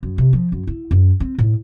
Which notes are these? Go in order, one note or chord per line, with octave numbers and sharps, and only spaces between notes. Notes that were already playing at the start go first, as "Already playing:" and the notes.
F#2
C3
F3
F#2
E4
F#2
C4
A2